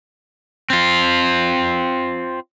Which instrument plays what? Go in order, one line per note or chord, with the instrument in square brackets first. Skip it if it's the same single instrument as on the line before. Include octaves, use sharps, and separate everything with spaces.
[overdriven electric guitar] C4 F4